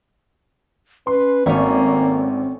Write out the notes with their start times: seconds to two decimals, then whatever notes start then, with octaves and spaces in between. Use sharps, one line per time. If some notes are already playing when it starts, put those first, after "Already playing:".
1.07 C#4 B4 C6
1.46 G#1 A3 A#3 C4 C#4